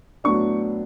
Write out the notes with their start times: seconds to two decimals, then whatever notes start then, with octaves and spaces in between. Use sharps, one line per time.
0.24 A2 F#3 B3 D4 C#6